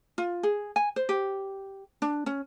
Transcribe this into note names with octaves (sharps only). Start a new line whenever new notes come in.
F4
G#4
G#5
C5
G4
D4
C#4